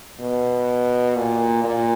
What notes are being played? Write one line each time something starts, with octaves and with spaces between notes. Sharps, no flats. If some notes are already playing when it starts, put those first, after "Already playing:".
B2
A#2
A#2